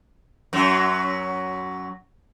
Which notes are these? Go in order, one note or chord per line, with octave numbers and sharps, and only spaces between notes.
F#2 F#3